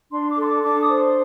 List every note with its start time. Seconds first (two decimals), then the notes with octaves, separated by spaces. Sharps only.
0.11 D4 C6
0.29 D6
0.37 A4 C6
0.46 D6
0.63 D4 D6
0.81 D#6
0.89 C5